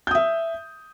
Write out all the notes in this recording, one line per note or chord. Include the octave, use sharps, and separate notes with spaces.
E5 D#6 G6